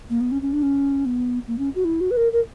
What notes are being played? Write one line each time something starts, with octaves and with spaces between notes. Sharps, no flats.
A#3
B3
C#4
C#4
D4
C#4
B3
A#3
C#4
F#4
E4
F#4
B4
A#4
A#4